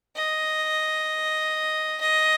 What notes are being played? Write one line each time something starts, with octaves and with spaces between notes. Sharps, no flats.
D#5
D#5